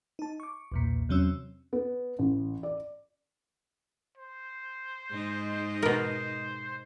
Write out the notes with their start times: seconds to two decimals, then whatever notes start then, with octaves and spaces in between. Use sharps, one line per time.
0.19 D#4 A5
0.40 C#6 D6
0.72 B1 E2 A#2
1.09 E2 C3 F#3 C4 C#4 E6
1.73 B3
2.19 A1
2.63 D5
4.18 C5
5.11 G#2 D#4
5.82 B2 A#4 C5